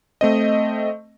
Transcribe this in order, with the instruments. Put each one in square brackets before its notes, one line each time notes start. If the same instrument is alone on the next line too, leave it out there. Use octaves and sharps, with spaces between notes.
[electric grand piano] A3 C4 D#5